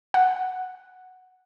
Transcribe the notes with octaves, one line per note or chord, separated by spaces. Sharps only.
F#5